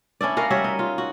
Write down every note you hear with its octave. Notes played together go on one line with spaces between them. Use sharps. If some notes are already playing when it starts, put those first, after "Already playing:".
C#4 D4 E4 D5
C#4 F#4 A#4 F5
G3 F#4 C#5 E5
D#4
F4
F#4